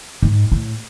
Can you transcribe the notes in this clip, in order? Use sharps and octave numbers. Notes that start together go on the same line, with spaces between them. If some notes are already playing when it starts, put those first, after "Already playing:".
G#2
A2